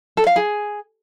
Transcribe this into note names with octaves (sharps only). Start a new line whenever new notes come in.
A4
F5
G#4